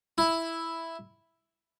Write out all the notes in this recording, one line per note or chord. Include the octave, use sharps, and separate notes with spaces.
E4